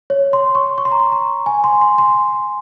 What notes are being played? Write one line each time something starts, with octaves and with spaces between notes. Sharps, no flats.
C#5
C6
C#6
C#6
C6
A#5
C6
A#5
G#5
C6
C6
C6